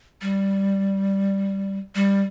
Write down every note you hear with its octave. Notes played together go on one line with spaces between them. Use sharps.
G3
G3